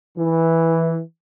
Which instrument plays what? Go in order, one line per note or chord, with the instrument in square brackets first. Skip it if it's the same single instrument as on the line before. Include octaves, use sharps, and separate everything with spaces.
[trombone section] E3